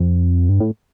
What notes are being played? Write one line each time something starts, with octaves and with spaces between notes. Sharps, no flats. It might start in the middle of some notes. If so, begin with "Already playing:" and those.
Already playing: F2
G2
A2